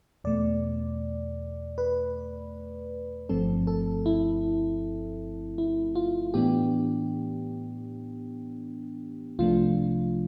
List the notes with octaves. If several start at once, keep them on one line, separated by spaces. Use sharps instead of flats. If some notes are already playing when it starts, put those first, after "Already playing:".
E2 B2 A3 D5
B4
G1 G2 F3 A3 C4 A4
A4
E4
E4
F4
A2 E3 B3 D4 G4
C2 C3 F3 A3 D4 F4